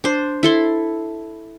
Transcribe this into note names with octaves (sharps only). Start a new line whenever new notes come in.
D4 C5
E4 A4 C6